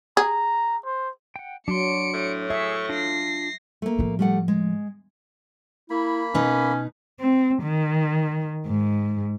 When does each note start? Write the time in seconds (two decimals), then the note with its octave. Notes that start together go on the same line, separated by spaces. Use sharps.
0.17 G#4 A#5
0.85 C5
1.36 F#5 G5
1.68 F#3 D4 C6 C#7 D7
2.14 A2
2.50 G#4 E5 C#6
2.89 D4 F4 A#6 C7
3.82 A3 A#3
3.98 A2 F3
4.19 G3 A3 F#5
4.48 G#3
5.90 A#3 E4 B5
6.34 B2 C#4 D#4 B4
7.20 C4
7.63 D#3
8.66 G#2